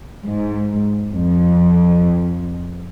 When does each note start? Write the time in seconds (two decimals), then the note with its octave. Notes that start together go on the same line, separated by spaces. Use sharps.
0.24 G#2
1.12 F2